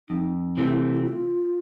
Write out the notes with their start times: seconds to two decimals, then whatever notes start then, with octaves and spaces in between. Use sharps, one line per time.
0.09 F2 D#4
0.57 C3 E3 A3 C4 E4
0.93 E4
1.04 F4